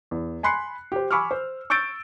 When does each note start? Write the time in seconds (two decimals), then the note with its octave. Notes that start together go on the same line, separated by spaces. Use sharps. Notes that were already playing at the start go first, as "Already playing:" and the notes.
0.11 E2
0.43 G#5 B5 C6 F#6 C7 C#7
0.92 G4 C5
1.11 G#5 B5 C#6 D6 E6 F6
1.31 C5
1.70 C#6 E6 G6 A6 D7